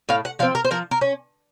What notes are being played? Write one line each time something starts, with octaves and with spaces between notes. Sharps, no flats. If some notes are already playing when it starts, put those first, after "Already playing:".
A2 F5
F#5
F3 C4 F5
A#4
C5
F3 A#4
A#4
C#4